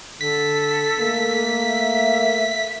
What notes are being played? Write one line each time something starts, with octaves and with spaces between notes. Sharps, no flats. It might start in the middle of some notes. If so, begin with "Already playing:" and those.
D3 A4 B6
A3 A#3
E5